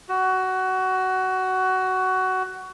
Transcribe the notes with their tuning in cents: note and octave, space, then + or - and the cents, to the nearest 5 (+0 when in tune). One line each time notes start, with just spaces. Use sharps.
F#4 +15